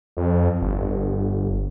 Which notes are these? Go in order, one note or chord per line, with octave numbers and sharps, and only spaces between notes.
F2
G1